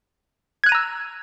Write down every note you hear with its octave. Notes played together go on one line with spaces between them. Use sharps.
A#5 E6 F#6 G#6 D#7